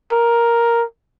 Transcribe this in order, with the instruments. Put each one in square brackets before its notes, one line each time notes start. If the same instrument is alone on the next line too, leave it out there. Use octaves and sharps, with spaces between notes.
[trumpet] A#4